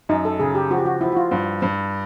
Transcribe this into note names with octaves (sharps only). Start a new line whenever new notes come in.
F#2 D#4
A4
C#3 G#4
G4
F3 F#4
G4
F#4
F3 E4
F#4
F4
G2
G2